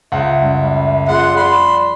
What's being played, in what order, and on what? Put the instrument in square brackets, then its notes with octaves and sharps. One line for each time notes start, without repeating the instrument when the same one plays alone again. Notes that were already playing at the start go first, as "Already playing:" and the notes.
[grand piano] C#2 F#5 [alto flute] E5
[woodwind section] F#2 G3
[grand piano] F3 [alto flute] G#4 [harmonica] F#5 C6
[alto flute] D5 [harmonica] B5 C6